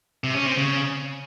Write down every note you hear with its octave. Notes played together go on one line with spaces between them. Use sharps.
C3
C#4
C4
C#3